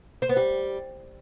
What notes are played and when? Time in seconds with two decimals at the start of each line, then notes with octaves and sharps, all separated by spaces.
0.22 C5
0.29 B3
0.36 G3